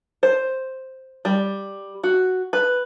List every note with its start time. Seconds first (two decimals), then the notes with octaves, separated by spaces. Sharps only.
0.23 C5
1.25 G3
2.03 F#4
2.53 B4